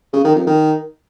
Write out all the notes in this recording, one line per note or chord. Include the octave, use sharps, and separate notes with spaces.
C#3
D#3
F2
D#3